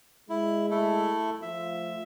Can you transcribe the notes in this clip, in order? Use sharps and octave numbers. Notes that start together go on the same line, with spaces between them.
G#3 E4
A3 E4 A4
F3 A3 F4 E5